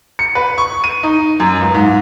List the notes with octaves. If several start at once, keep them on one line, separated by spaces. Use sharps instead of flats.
C#7
B4
C#6
D#7
D#4
F#2
C#2
G#2